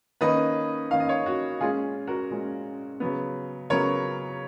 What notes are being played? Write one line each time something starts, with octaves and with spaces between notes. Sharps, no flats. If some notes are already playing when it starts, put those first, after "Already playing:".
D#3 A#3 C#4 B4 D#5
D#3 A#3 C#4 F5
D#5
C#5 F5
F#4
A#2 G#3 C#4 F4 G#4
F#4 A#4
A#2 G#3 C#4
C#3 F#3 B3
C#3 F#3 B3 A#4 C#5